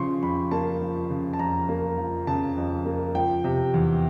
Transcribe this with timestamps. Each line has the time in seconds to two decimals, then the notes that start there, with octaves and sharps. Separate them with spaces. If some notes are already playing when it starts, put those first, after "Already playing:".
Already playing: C#3 F3 C6 C#6
0.22 F2 B5
0.51 A#3 A5
0.81 F3
1.10 C#3
1.33 A5
1.39 F2 A#5
1.69 A#3
1.98 F3
2.27 C#3 A5
2.57 F2
2.86 A#3
3.15 F3 G5
3.44 C3
3.74 E2